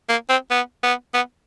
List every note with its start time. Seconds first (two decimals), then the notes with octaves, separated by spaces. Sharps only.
0.09 A#3
0.29 C4
0.51 B3
0.83 B3
1.14 B3